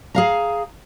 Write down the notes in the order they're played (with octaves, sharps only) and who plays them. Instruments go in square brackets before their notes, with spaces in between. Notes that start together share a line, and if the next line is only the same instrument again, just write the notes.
[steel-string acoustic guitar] G#4 F5 A#5